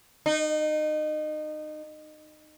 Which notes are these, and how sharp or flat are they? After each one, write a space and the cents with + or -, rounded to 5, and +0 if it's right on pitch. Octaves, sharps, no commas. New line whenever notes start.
D#4 -25